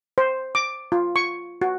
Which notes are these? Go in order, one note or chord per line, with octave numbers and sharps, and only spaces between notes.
C5
D6
F4
C#6
F#4